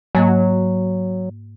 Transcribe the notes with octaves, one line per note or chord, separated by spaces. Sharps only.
G#2 F#3 A#3 D#5